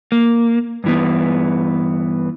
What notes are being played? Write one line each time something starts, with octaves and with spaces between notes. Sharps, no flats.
A#3
G2 E3 B3